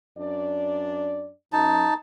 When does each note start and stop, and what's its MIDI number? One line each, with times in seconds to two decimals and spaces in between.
0.17 1.31 42
0.17 1.31 62
0.17 1.31 74
1.53 1.84 42
1.53 1.94 63
1.53 1.94 81